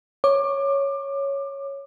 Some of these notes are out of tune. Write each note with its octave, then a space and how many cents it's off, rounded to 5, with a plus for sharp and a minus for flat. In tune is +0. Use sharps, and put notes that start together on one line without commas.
C#5 +0 D6 +20